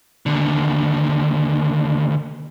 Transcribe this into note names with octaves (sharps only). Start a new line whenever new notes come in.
D#2 D3